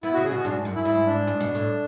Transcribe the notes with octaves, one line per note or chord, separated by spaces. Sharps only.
B3 E4
C#3 F#4
G#4
B2 F#4
G#2 D4
F#2
E4
G#2 E4
D4
G#2
B2
A2